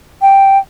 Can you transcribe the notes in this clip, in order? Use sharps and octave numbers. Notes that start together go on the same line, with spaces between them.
G5